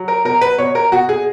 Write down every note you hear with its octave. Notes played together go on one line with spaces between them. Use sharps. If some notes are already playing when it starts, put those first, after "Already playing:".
Already playing: F#3
A#4
B2 A#4
B4
B2 C#5
A#4
B2 F#4
G#4